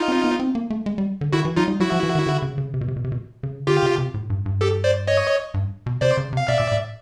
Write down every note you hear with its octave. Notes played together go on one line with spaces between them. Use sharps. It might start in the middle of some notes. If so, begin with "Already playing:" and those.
Already playing: D#4 F4
C4
B3
C4
A#3
A3
G#3
G3
D3
D#3 E4 F#4
E3
F#3 D#4 F4
G3
F#3 E4 F#4
F3
E3
D#3
D3
C#3
C#3
C3
B2
C3
B2
C3
B2
C#3
D3 F4 G4
C#3
C3
A2
G2
G2
G4 A4
C5 D5
C#5 D#5
G2
B2
C3 C5 D5
C#3
C3 F5
B2 D5 E5
A#2
A2